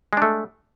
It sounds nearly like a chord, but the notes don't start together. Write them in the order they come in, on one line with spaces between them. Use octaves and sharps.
G#3 D4 A3